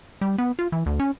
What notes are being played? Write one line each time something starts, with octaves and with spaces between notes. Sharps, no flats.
G3
B3
F4
E3
D2
C#4